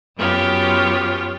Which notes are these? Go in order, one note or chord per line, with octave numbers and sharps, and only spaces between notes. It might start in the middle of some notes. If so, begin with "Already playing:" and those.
F#2 B3 F4 G4 C#5